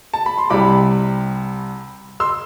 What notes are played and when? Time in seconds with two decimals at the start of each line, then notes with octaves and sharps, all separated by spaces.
0.14 A5
0.26 B5
0.38 C6
0.50 C2 C3 G3 B5 D6
2.20 C6 E6